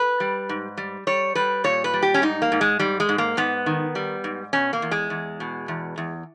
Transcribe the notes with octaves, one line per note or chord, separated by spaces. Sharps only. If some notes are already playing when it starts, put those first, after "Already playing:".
Already playing: B4
G3
G#2
G3
G3 C#5
G3 B4
A#2 C#5
B4
G3
G4
C#4
G#2 D#4
A#3
G#2
G#3
G#2 G3
G#3
G#2
A#3
G#2 B3
D#3
G3
G#2
B2 C#4
A#3
E2
G#3
E2
B2
E2
E2